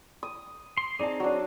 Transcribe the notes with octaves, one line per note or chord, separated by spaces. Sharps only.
D#6
C6
C4 D#4 G#4 D5 A5
F#3 D4